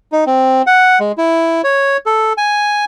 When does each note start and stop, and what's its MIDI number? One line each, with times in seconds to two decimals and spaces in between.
0.12 0.24 63
0.26 0.62 60
0.67 0.99 78
1.00 1.12 56
1.18 1.62 64
1.64 1.97 73
2.06 2.33 69
2.37 2.85 80